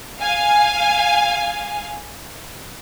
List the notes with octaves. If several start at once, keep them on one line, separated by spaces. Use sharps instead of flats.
F5 G#5